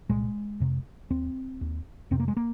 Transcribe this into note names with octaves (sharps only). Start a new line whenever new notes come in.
C2 A#2 G#3
F2 C3
D#2 C4
D#2
F2 C3 C4
A#3
G#3
A#3